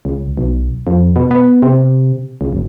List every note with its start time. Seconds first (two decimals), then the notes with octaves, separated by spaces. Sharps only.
0.05 C#2
0.37 B1
0.87 F2
1.16 B2
1.31 B3
1.62 C3
2.41 C#2
2.53 F#1